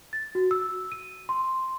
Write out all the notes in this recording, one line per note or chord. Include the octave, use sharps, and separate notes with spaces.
A6
F#4
E6
D#7
C6